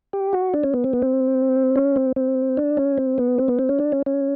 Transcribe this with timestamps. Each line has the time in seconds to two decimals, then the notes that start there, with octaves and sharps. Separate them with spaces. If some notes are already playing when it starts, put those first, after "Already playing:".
0.13 G4
0.33 F#4
0.54 D4
0.64 C#4
0.74 B3
0.84 C4
0.93 B3
1.02 C4
1.76 C#4
1.96 C4
2.16 C4
2.57 D4
2.77 C#4
2.98 C4
3.18 B3
3.38 C4
3.48 B3
3.59 C4
3.69 C#4
3.79 D4
3.92 C#4
4.06 C#4